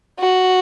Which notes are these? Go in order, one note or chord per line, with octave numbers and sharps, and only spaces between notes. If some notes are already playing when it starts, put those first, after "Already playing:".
F#4